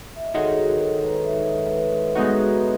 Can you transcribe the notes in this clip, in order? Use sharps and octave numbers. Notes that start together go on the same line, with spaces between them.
E5
D#5
D#3 G#3 D#4 F#4 A4 C#5
A4 C#5
B4 D#5
C#5 E5
B4 D#5
G#3 B3 D#4 F#4